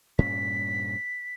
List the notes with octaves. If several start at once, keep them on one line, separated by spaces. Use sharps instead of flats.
G2 A#2 C#4 B6